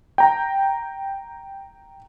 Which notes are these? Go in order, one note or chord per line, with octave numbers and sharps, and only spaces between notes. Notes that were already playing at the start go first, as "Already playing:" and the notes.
G5 A#5